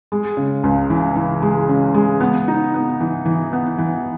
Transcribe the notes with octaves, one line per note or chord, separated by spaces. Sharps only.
G#3
C#3
C#2
E3
E3
G#3
C#3
G#3
B3
D#4
B3
E3
E3
B3
E3